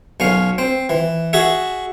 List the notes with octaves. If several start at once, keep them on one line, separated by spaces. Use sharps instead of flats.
B1 C#4 F5
C4
E3
F#4 G#4 E5